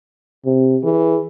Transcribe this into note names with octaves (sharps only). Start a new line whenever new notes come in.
C3
E3 G#4